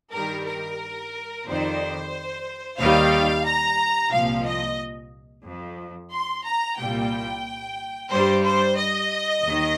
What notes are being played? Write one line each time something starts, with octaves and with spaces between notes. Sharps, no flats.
G2 D#3 G3 A#4
A#4
F2 D#3 G3 C5
D#2 D#3 G3 F5
A#5
C2 A#2 F3 F5
D#5
F2 F3
C6
A#5
C2 A#2 G3 G5
G2 G3 C5
C5
D#5
D#2 D#3